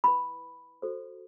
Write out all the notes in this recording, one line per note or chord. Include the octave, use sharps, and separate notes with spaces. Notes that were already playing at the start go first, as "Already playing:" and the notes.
E4 B4 B5
F#4 A4 C5